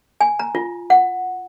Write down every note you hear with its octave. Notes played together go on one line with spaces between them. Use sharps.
G#5
A#5
F4
F#5